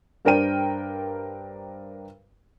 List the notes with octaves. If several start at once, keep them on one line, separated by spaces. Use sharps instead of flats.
G2 D4 A#4 C5 G5 D#7